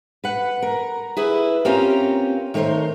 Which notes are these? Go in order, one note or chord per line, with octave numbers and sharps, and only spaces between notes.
B4 F#5
A#4
E4 G#4 B4
A#3 C4 C#4 F4 G4 A#4
D#3 A3 A#4 C5 C#5